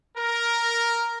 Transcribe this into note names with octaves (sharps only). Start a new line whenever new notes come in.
A#4